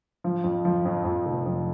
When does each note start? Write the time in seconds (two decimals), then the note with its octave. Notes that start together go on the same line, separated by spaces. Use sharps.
0.24 F3
0.44 F2
0.65 F3
0.85 F2
1.05 F2
1.26 F1
1.46 F2